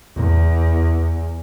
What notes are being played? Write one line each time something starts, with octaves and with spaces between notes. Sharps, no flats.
E2